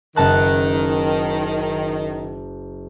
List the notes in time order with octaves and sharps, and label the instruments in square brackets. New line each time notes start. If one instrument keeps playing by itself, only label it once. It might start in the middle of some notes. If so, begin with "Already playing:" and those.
[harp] F#1 A5 F#6 [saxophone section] D#3